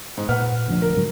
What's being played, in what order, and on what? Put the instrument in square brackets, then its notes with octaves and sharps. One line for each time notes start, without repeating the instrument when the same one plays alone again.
[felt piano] G#2
[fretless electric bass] A#2 [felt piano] B4 F#5 F6
[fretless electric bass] D2 F3 D4
[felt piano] A#4
[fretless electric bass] G#2 D3 F#3